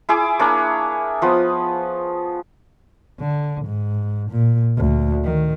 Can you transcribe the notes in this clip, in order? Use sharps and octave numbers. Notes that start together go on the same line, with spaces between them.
E4 G#4 G#5 D6
A#3 D4 G#4 C#5
F3 B3 D#6
D3
G#2
A#2
D2
D#3